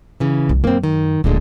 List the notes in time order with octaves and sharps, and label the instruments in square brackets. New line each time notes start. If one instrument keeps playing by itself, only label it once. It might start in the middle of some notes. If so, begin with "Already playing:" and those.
[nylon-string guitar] C#3 E3
[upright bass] C2
[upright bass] F#2 [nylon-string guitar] A#3 C4
[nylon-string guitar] D#3
[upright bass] D1 [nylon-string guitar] A#2 D3 G#3